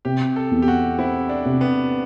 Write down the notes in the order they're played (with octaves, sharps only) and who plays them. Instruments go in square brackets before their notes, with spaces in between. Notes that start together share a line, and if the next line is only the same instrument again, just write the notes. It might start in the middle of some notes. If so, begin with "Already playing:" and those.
[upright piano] C3 [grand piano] G4
[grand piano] A4
[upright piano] E2
[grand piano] G4
F#4
[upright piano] C4 [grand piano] E4
[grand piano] D4
[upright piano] C3
[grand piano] B3